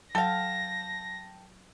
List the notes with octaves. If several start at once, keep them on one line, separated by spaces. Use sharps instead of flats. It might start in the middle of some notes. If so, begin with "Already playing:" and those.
F#3 A4 F5 G5 A5 A#6